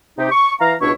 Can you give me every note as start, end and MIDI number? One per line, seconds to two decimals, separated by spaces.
0.18 0.28 48
0.18 0.28 63
0.18 0.28 67
0.31 0.53 85
0.60 0.74 52
0.60 0.74 77
0.60 0.74 82
0.81 0.92 37
0.81 0.92 47
0.81 0.92 62
0.81 0.92 64
0.81 0.92 73
0.81 0.92 85